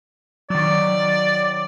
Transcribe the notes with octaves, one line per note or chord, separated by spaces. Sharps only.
D#3 F#3 D5